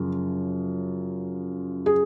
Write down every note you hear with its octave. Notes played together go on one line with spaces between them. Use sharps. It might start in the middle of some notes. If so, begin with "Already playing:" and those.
Already playing: F#2 C#3 F3 F4
G#4